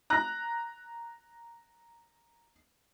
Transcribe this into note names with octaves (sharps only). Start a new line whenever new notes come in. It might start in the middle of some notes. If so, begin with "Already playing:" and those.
A#5 F#6 A#6